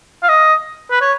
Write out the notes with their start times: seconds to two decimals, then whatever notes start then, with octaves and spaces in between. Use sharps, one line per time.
0.23 F5
0.29 D#5
0.91 B4
1.01 C#5